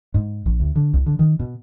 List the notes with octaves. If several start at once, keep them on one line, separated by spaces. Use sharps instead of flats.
G#2
A#1
D2
D3
C2
D3
D#3
B2